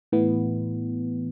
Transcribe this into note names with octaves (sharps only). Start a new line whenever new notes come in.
A2 E3 B3